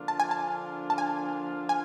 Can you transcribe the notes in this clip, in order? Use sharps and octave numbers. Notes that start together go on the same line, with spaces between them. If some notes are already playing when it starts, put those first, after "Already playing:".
Already playing: D3 F3 A#3 D4 F4
A5
G#5
A5
A5
G#5
G#5